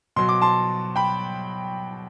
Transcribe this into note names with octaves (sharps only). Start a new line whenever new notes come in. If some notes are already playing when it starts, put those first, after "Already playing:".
B2 F#3 C6
D6
A5 C6
G5 B5